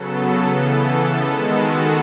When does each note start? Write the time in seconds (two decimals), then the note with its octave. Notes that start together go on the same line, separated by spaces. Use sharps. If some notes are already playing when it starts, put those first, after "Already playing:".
Already playing: C#3 F#3 B3 A4
0.21 A4
0.54 C#3 E3 B3
0.88 A4
1.21 D#3 G#3 B3 A4
1.55 F#4